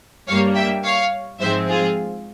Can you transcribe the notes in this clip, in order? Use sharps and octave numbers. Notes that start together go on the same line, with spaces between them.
G2 G3 A#3 C#5 F5
E5 G5
C#5 F5
G#2 F3 G#3 C4 C5 E5
F4 G#4